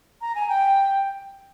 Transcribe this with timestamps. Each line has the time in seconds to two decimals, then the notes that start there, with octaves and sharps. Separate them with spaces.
0.21 A#5
0.35 G#5
0.49 G5